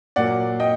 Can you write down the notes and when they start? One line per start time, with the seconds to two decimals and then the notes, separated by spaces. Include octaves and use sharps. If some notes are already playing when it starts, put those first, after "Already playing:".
0.16 A#2 F#3 A#3 D5 F#5
0.60 D#5 G5